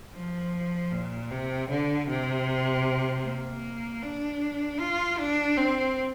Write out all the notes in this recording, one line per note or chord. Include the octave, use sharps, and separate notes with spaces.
F3
A#2
C3
D3
C3
A#3
D4
F4
D4
C4